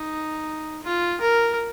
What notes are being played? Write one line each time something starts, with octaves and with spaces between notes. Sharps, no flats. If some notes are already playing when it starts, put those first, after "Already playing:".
Already playing: D#4
F4
A#4